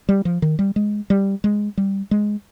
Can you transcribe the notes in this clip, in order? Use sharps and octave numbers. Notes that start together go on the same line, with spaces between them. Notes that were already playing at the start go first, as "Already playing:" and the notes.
G3
F3
D#3
G3
G#3
G3
G#3
G3
G#3